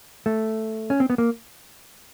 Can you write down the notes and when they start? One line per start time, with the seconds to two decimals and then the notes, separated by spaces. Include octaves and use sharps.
0.26 A3
0.90 C#4
1.00 C4
1.10 B3
1.18 A#3